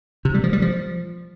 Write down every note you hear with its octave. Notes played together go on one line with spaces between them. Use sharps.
C3
G3
F3
G3
F3